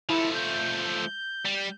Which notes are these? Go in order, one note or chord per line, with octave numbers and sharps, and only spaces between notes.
F3 A3 E4
G6
G3